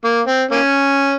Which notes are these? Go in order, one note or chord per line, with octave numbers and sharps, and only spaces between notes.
A#3
C4
A#3 C#4